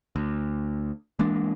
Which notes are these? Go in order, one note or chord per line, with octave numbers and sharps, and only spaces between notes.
D2
E3 G#3 A#3 D4